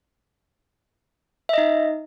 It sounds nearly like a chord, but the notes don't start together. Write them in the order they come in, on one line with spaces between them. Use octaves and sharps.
E5 D#5 D#4